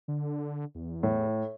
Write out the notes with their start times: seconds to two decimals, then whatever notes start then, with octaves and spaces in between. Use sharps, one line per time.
0.08 D3
0.75 E2
1.03 A2